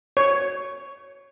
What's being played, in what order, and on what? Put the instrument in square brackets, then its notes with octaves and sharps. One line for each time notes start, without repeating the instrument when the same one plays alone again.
[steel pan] C#5